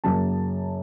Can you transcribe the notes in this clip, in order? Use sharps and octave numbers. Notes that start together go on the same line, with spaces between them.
F#2 C#3 F#3 A#3 A5